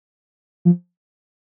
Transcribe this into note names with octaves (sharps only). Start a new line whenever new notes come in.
F3